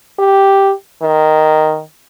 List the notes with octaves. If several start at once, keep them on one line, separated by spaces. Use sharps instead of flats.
G4
D#3